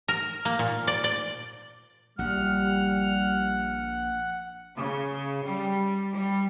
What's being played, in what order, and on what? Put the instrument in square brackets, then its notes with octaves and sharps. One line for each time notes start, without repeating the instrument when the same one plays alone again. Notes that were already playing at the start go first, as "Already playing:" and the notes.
[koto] A#4
A#3
A#2
D5
D5
[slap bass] A#1 [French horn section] G3 [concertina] F#5 [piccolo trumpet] F6
[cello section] C#3
G3
G3